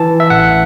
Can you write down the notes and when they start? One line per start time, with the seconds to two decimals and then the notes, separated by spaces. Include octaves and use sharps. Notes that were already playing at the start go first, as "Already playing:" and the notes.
Already playing: E3 A5
0.20 E5
0.30 A1 F#5